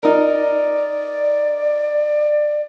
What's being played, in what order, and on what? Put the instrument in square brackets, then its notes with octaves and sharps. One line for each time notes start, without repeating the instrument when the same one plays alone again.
[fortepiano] D#4 A#4 [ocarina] D5